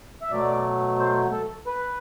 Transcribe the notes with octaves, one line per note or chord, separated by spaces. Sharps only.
E5
B2 F#3 A3 D5
C5
A4
B4